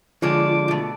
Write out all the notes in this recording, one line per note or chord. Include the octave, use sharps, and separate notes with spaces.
D3 F3 G#3 D4 F4 C#5 D6
B2 A3